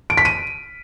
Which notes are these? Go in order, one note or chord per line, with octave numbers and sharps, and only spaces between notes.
D7
B6
D#7